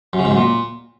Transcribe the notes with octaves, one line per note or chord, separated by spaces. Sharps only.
F#2
C#3
G#2
F#2
A#2